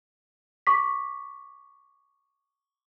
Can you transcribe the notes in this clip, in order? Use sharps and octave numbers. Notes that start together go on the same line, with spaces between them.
C#6 D6 B6